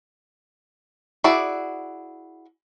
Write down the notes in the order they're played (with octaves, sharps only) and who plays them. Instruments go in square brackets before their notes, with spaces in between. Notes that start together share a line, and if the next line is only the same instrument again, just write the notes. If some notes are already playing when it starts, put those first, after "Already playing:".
[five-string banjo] E4 F#4 G#4 D5